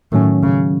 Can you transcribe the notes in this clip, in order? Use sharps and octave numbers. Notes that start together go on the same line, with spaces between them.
A2 D#3 F#3 C#4
C#3